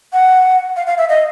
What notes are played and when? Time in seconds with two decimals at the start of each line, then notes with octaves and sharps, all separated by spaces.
0.13 F#5
0.76 F5
0.87 F5
0.98 E5
1.09 D#5